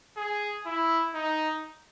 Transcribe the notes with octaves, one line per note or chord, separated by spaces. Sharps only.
G#4
E4
D#4